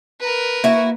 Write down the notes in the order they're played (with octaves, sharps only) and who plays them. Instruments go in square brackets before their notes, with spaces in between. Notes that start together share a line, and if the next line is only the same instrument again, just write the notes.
[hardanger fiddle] A#4 B4
[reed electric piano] A#3 [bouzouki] E4 F#4